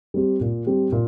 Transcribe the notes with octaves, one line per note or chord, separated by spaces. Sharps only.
G3 C4 G4
A#2
G3 C4 G4
A#2